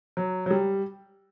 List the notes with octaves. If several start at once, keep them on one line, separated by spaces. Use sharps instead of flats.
F#3
F#3
G3